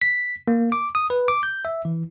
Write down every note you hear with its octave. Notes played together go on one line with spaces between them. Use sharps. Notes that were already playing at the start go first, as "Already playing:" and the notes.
B6
A#3
D6
D#6
B4
D6
G6
E5
E3